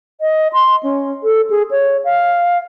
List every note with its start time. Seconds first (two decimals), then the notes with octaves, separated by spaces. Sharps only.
0.21 D#5
0.53 C6
0.83 C#4
1.24 A4
1.50 G#4
1.71 C#5
2.04 F5